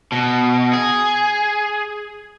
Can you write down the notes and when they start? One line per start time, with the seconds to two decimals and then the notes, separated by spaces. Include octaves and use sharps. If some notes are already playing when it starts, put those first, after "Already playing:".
0.12 B2
0.73 G#4